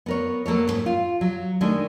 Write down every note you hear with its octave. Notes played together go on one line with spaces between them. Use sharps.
B3 A#4 C#5
F#3 A#3 A4 C#5
F2 G#2
F4
F#3
D#3 G#3 A3 D4